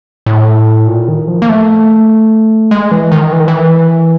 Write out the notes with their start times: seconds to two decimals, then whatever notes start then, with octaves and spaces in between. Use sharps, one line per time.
0.26 A2
0.87 A#2
1.08 D#3
1.28 F3
1.42 A#3
1.49 A3
2.71 G#3
2.91 E3
3.12 D#3
3.32 E3
3.40 D#3
3.48 E3